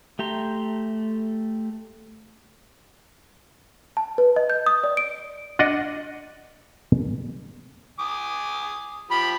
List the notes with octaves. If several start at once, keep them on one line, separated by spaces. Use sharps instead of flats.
A3 G4 A#5 C6
A5
B4
D#5
G6
D#6
D5
D7
D4 D5 D#5 F#5
G#5 D6 D#6
F3 G4 B5